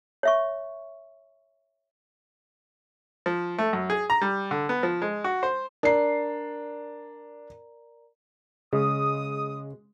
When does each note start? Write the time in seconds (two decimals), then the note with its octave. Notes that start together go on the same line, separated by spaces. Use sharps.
0.23 C#5 E5 C#6
3.26 F3
3.58 A3
3.73 F#2
3.90 G#4
4.10 A#5
4.21 G3
4.51 D3
4.69 B3
4.83 F3
5.02 G#3
5.24 F#4
5.43 C5
5.83 D4 A#4 D5 A#5 C7
8.73 C#3 G#3 D#6